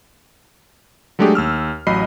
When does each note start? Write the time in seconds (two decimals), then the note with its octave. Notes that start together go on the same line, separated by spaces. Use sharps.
1.19 F#3 G#3 A3 D4 G4 G#4
1.35 D#2 E6 F6
1.87 A1 F#3 D#5 B5 C7